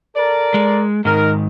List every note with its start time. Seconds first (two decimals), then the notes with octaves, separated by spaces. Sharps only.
0.16 A4 A#4 D5
0.54 G#3
1.05 G#2 D#3 D#4 A#4